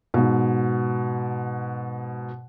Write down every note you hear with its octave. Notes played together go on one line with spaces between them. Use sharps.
G#2 B2